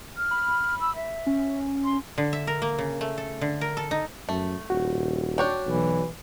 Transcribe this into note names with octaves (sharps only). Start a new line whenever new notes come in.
F6
B5
E6
E5
C#4
C6
D3
E5
A#4
A#3
C#3
A3
A4
D3
A#4
A4
D#4
F#2 A3
D#1 F#4
D4 C#5 G5
B1 E3